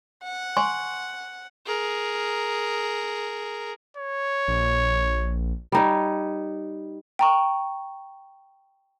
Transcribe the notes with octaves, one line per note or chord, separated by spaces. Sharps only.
F#5
G#5 C6 C#6
G#4 A#4
C#5
A#1
G3 D#4 C#5
G5 A#5 C#6